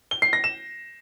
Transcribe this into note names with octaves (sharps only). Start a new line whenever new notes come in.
G7
C7
A#6
E7